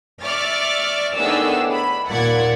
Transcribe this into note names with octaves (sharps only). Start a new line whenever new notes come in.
D5 E5 C#6 D6 F6 A6
A2 D#3 B3 D4 G#4 E6
B5
D#2 A#2 D5 F#5 G#6